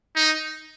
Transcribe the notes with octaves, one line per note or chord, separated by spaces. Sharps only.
D#4